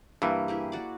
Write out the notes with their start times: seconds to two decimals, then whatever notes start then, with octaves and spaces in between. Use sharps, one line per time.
0.22 G2 E3 A#3
0.48 E4 G4 G#4
0.72 F#4 D5